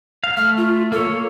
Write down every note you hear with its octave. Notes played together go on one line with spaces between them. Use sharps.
F5
A3 F6
F4
A#3 A4 C#5